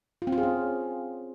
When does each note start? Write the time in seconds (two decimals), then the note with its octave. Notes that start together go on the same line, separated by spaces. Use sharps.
0.22 F4
0.27 C4
0.32 F4
0.38 G#4
0.43 C#4